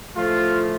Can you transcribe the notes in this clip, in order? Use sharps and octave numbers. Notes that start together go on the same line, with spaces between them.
A2 F3 A3 F4